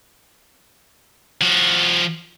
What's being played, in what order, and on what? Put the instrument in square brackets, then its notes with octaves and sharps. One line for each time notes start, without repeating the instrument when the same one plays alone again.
[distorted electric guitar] F3 F#4